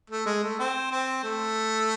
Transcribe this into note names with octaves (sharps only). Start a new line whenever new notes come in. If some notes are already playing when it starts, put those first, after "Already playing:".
A3
G#3
A3
C4
C4
A3